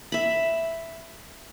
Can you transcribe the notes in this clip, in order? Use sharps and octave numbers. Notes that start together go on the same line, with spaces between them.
E5 B5